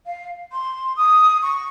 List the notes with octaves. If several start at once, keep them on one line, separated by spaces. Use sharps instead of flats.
F5
C6
D#6
C#6